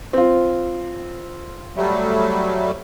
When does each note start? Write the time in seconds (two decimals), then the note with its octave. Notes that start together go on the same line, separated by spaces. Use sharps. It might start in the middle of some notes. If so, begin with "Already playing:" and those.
0.13 C4 F4
1.77 F#3 G3 A3